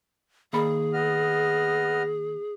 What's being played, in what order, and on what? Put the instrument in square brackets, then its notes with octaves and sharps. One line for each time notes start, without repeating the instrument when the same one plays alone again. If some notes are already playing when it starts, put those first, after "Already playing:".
[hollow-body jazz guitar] D#3 A#3 B5 [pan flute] G#4
[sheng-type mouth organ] B3 D#5 F6